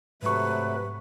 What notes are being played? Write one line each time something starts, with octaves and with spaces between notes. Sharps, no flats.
G#2 C3 F#3 A3 B4 C#6